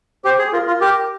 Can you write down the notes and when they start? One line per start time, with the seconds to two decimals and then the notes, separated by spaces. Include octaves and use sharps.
0.25 G4 C5
0.38 G#4
0.49 G#4
0.53 F4 A#4
0.67 F4
0.81 G4 A#4